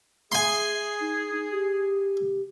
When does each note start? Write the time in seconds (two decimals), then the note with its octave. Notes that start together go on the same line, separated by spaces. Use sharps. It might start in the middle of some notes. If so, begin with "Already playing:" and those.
0.32 G#4 E5 G#5 C6
1.00 D#4
1.52 G4